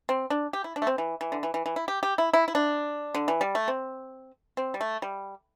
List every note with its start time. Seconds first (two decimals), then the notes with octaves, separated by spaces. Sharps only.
0.09 C4
0.30 D4
0.53 G4
0.64 E4
0.76 D4
0.82 A3
0.87 C4
0.98 E3
1.21 E3
1.32 D3
1.43 E3
1.54 E3
1.66 E3
1.76 E4
1.88 G4
2.03 G4
2.18 E4
2.33 E4
2.48 E4
2.55 D4
3.15 D3
3.28 E3
3.41 G3
3.55 A3
3.68 C4
4.57 C4
4.74 G3
4.81 A3
5.02 G3